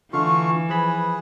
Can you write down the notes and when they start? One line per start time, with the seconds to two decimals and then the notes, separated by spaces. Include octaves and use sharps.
0.13 D3 E3 A3 F4 F5 C#6
0.69 F3 G#4 B4 B5